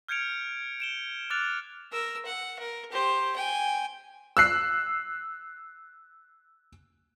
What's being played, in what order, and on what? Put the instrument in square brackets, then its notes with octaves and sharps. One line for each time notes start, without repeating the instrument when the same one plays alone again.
[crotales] F6 G6 G#6 C#7 D7 F7
D7 E7 G7
D6 F6 F#6 A6 F7
[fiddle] A#4 E6
F#5
A#4
G4 C5
G5 G#5
[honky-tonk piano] E6 F#6 C7